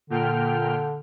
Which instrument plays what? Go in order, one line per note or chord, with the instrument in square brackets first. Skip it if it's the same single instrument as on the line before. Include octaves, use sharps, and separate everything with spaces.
[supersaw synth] A#2 G5 F6 [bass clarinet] D3